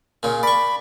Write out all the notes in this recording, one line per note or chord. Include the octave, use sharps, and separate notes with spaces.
A#2 C#3
D5 B5 C#6